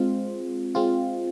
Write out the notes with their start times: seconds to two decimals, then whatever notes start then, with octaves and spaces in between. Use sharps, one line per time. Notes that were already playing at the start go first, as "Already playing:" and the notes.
Already playing: G#3 C4 F4
0.75 G#3 C4 F4